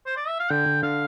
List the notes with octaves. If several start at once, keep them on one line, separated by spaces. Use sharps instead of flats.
C5
D5
E5
F5
D3 G5
D3
D3 F5